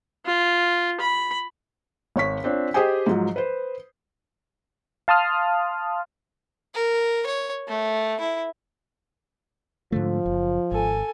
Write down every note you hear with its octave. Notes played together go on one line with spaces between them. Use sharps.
F4
B5
G#1 C#5 C#6 B6
C4 D4 F4 C#5
G4 G#4 C5 D#5 G5 G#5
G#2 F3 F#3
B4 C5
F5 A5 C6 D#6 F6
A#4
C#5
A3
E4
G#2 D3 F3 A3
F#1
G#1 A4 G#5